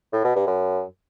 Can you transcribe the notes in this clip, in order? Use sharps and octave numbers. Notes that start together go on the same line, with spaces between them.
A2
B2
G2
F#2